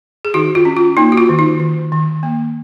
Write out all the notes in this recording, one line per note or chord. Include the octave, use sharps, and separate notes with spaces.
G#4
D#3 D#4 F#4
F4
C#4
F4
A#3 D#4
F#4
F4
D#3
D#4
D#3
D#3
A#3